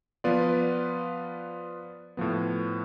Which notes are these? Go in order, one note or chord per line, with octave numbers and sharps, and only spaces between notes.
F3 B3 F4 B4 D5
A2 F3 B3